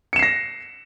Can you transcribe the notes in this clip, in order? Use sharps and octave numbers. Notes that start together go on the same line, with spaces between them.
A#6 C7 C#7 E7